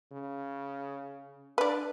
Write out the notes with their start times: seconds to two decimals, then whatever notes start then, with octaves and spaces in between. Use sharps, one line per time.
0.12 C#3
1.58 D4 B4 D5